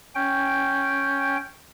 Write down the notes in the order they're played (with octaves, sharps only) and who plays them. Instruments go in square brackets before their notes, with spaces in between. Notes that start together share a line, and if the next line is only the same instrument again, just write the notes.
[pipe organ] C#4 G5